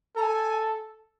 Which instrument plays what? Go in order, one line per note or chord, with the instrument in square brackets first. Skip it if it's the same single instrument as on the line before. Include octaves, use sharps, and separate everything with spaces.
[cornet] A4 [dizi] G#5 A#5